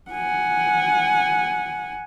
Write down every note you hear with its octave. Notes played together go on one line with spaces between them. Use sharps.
F#5 G#5